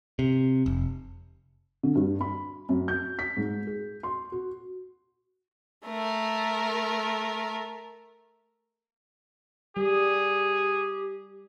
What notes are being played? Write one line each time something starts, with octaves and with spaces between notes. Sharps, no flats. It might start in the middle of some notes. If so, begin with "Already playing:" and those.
C3
F1
D3
G2
B5
F#2
G6
B6
G#2
G#4
C6
F#4
A3 A#4
G3 G4 G#4